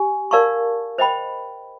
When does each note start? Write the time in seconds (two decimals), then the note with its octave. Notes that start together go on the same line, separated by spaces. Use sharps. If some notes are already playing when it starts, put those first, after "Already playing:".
Already playing: G4 G#5
0.31 A#4 D5 F5 A5 C#6
0.98 C5 D#5 G5 B5